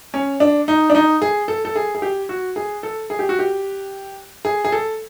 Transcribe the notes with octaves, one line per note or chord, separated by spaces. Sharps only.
C#4
D4
D#4
D4
D#4
G#4
A4
A4
G#4
G#4
G4
F#4
G#4
A4
G#4
G4
F#4
G4
G#4
G#4
A4